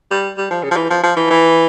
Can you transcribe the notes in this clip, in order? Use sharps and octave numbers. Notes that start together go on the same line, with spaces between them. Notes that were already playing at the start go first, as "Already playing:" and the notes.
G3
G3
F3
C#3
F3
E3
F3
F3
E3
E3